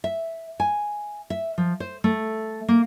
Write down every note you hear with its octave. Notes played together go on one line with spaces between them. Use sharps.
E5
G#5
E5
F3
C5
A3
A#3